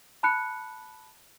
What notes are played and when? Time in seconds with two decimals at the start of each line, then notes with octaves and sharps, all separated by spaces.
0.23 A5 B5 F#6 C#7